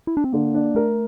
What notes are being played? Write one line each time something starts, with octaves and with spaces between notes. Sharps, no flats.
E4
D4
C4
D3 A#3
D4
A3 A#4